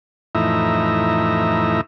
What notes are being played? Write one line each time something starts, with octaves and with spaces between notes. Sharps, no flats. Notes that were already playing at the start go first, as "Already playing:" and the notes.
F2 A2 E3 D#4 E5 A#5